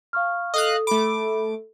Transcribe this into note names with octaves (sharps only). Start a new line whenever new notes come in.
F5 C#6 F6
A4 D#5 F5 D#6 F#6
A3 B5 D6